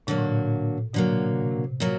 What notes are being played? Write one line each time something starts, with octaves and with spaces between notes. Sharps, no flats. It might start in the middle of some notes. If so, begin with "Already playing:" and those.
A#2 D3 F#3 A#3
A2
A#2
B2 D3 F#3 A#3
C3
C3
A#2 F#3 A#3